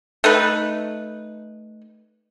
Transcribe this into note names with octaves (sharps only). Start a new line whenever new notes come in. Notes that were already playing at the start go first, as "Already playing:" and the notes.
A3 D#4 B4